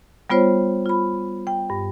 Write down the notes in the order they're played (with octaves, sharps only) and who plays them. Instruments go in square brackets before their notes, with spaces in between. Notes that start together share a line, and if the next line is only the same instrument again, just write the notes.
[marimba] G3 B3 F4 C5 C#5
F4 B5
G5
G2